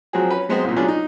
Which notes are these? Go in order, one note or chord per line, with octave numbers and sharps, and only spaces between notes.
F3 F#3 C4 F#4 G#4
C#4 B4
F#3 G#3 B3 C4 F#4
C2 A#2
F#3 B3 C#4 D4 F4 G#4
D#4